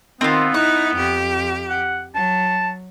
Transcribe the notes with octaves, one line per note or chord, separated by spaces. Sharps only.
D#3 B3 C4 F4
D#4 E4 F#6
F2 G4
F#5
F#3 A5